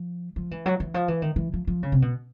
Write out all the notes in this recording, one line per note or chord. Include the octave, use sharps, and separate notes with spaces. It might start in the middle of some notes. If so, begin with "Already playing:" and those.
Already playing: F3
F3
E3
F#3
E3
F3
E3
D#3
E3
F3
F3
C#3
C3
B2